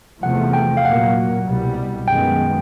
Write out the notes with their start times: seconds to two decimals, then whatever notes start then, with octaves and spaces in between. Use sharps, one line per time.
0.23 E2 C3 F3 A3 F#5
0.53 G5
0.77 F5
0.85 A#2 F#3 A#3 F#5
1.46 C2 B2 G3
2.08 F#2 D#3 G#3 B3 G5